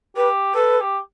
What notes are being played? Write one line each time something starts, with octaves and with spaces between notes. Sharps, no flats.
G4 B4
A4 B4
G4